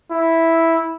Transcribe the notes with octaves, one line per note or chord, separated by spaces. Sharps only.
E4